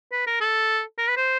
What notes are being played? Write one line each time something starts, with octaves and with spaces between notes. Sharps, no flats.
B4
A#4
A4
A#4
B4
C5